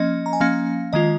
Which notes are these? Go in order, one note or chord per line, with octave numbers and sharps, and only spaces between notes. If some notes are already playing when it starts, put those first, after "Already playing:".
Already playing: F3 A#3 C#4 D#5
A#5
G#5
F3 A#3 C#4 F5
D#3 G#3 F4 D#5